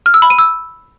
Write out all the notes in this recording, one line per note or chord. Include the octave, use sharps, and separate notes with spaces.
F6
E6
B5
D#7
E6